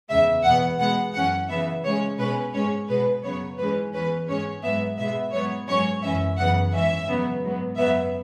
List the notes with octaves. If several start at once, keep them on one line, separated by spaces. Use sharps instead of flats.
E2 C#3 G#3 E5
E2 B2 B3 F#5
B2 G#3 B3 F#5
F#2 E3 C#4 F#5
C#3 E3 B3 E5
C#3 G#3 C#4 C#5
B2 G#3 C#4 B4
G#2 G#3 C#4 C#5
B2 G#3 B3 B4
F#2 C#3 F#3 B3 C#5
G#2 E3 G#3 C#4 B4
E2 E3 C#4 B4
G#2 G#3 C#4 C#5
G#2 F#3 B3 E5
B2 G#3 B3 E5
G#2 F#3 B3 C#5
G#2 F#3 C#4 C#5
F#2 E3 C#4 E5
F#2 C#3 E3 B3 F#5
G#2 E3 C#4 E5
C#3 F#3 B3
G#2 F#3 B3
F#2 C#3 F#3 B3 E5